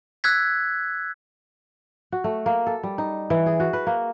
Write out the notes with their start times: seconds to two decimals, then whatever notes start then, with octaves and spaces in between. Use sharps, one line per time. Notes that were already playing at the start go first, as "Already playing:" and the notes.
0.24 E6 F#6 G#6 B6
2.12 F#4
2.24 A3
2.46 A#3
2.67 A4
2.83 G3
2.98 D#4
3.30 E3
3.46 G#4
3.60 F#4
3.73 B4
3.87 A#3